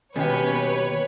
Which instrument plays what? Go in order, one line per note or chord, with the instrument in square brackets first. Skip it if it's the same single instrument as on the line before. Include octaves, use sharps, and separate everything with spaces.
[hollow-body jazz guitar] D#2 B2 [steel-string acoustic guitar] C#4 G4 [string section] B4 C#5